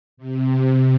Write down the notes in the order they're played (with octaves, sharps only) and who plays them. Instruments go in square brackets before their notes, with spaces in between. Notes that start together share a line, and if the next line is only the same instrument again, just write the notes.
[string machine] C3